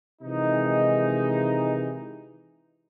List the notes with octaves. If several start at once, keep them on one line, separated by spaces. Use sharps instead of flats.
C3 D#3 E3 G#3 D#4